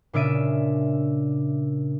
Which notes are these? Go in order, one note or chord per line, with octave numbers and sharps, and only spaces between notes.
A#2 C#3 D4 E5 D7 D#7